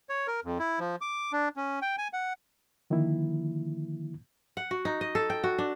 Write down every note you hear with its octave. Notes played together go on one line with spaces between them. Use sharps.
C#5
A#4
F2
E4
F3
D6
D4
C#4
G5
G#5
F#5
D3 D#3 F3 A#3 E4
F#5
F#4
D#4
D#5
A4
G5
F#4
D4